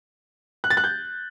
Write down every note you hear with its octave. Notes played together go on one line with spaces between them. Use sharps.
F#6
A6
F#6
G6